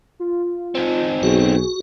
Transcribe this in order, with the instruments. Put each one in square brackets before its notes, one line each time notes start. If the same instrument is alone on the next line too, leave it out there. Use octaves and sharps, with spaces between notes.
[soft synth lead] F4
[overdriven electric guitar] C4 D#4
[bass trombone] B1 [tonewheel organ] F#4 [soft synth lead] G#4